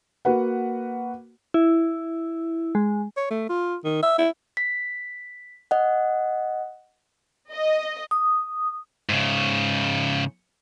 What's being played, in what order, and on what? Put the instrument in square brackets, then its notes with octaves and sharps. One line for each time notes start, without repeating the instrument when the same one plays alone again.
[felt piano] A#3 F#4 B4 F#5
[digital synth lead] E4
G#3
[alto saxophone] C#5
A3
F4
D#3
E5
E4
[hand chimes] B6
D#5 F#5
[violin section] D#5
[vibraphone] D#6
[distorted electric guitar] G#2 C#3